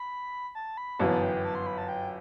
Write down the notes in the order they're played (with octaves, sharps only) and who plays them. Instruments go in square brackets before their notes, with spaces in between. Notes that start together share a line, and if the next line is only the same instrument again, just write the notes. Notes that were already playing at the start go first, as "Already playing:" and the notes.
Already playing: [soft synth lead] B5
A5
B5
[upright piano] G1 F#2 E3 B3 [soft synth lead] A5
[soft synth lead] G5
A5
C6
B5
A5
G5